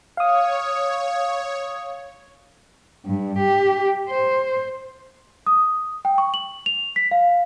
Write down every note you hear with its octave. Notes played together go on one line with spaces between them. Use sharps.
C#5 F5 D#6
G2
G4
C5
D#6
G5
C#6
F#7
F7
B6
F5